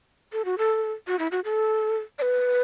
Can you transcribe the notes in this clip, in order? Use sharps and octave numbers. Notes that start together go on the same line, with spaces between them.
A4
F#4
A4
F#4
E4
F#4
A4
D5
B4